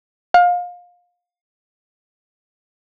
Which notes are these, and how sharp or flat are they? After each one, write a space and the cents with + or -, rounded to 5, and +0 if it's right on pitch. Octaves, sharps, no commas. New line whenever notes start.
F5 +25